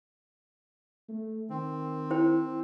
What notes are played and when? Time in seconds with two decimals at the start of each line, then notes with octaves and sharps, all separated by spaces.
1.09 A3
1.50 D#3 C4
2.10 E4 C5 G5